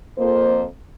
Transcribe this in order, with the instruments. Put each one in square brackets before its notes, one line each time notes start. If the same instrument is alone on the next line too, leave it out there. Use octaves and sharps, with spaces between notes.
[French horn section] F2 A#3 C5